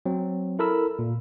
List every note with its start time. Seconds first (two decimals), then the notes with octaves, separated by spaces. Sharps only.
0.06 F#3 C4
0.59 E4 A4 A#4 B5 E6
0.99 A#2